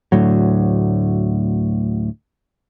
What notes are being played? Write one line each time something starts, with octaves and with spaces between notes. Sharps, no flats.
D2 A2 F#3